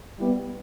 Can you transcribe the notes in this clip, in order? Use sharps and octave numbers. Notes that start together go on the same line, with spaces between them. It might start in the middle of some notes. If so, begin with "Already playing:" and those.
G3 B3 E4